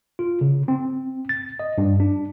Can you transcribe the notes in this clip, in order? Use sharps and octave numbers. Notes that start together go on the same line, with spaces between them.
F4
C#3
C4
A6
D#5
G2
D4